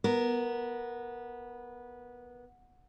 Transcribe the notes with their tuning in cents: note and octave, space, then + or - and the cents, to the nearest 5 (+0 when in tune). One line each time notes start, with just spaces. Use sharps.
B3 -15 A#4 +0